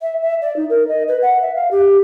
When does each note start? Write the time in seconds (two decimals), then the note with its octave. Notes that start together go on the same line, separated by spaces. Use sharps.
0.01 E5
0.22 E5
0.42 D5
0.56 D#4
0.70 A#4
0.88 D#5
1.08 B4
1.22 F#5
1.41 E5
1.55 F5
1.71 G4